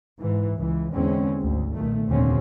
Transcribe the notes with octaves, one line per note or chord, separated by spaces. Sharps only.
G#2 E3
C#2 E3
E2 D3 G#3 C4 C#4
G#1 D2
B1 A#2 D#3 A3
F1 D#2 A#2 D3 C4 C#4